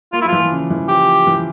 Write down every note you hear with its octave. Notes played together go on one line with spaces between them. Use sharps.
A#3 F4
E4
F3
E3 F4
C#3
E3
F3 G4
E3